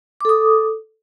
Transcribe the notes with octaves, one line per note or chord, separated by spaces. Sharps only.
A4 D6 D#6